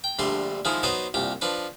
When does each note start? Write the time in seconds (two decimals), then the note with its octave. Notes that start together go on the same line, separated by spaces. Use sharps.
0.04 G5
0.19 A#1 D3 G3 A3 C6
0.65 D#3 F3 G#3 E4
0.83 F#3 B3 D#4 C5 D#6
1.14 C2 A#2 G4
1.41 F3 D4 B4